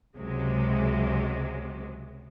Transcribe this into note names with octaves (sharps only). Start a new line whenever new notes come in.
C#2 C3 F#3 G#3